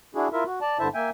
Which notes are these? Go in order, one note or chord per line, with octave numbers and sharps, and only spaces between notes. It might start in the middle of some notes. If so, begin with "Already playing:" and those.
D4 E4 F#4 G#4
E4 F4 A#4 E5
F#4
D5 A5
G2 D3 E4 C5 E5 A5
A#3 E5 G5 G#5